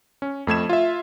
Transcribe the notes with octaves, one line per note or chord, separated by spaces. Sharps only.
C#4
F2 A3 G#6 E7
F4 E5